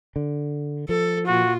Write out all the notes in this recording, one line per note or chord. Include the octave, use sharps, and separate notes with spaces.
D3
F3 A4
A#2 F4 F#4